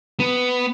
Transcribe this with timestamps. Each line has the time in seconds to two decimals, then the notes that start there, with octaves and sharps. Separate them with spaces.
0.20 B3